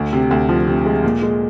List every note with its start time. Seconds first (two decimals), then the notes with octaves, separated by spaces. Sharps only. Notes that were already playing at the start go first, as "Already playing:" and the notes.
Already playing: D2
0.13 C3
0.31 D2
0.49 F3
0.67 C3
0.86 G#3
1.04 A#2
1.22 G#3